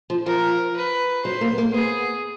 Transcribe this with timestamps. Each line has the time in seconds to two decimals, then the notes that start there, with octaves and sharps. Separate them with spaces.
0.10 F3
0.26 F3 A#4
0.76 B4
1.25 F#3 C5
1.41 A#3
1.53 B3
1.58 A#3
1.74 B3 G#4